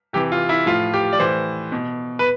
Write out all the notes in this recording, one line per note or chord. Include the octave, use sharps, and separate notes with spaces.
C3 E3 G4
F4
E4
A2 F3 F4
G4
D5
A2 E3 C5
B2
B4